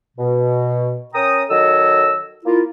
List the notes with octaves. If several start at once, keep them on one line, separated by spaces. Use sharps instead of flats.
B2
C#4 A#4 G5 A#5 D#6
D#3 F#3 A4 C#5 D#5 E6
A#3 E4 F4